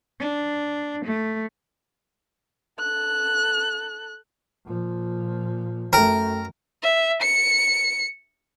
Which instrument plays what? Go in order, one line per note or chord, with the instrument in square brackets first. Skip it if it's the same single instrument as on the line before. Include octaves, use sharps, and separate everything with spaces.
[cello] D4
A3
[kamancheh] A4 F#6
[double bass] A#2 F3
[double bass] F#2 [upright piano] A3 G5 [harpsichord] A#4
[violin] E5
C#7